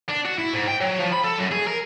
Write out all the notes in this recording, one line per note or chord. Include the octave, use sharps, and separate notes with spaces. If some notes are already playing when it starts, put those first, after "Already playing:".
D4
F#4
E4
G#2
G5
F#3
F3
B5
A4
F#2
G#4
A#4